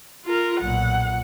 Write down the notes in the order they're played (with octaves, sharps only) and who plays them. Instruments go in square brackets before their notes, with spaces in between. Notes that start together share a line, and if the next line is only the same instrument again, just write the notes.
[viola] F4 A#4
[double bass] B1 A#2 [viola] F#5